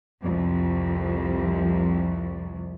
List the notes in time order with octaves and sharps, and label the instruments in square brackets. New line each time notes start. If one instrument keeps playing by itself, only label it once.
[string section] C2 F2